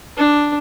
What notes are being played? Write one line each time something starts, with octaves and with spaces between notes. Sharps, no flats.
D4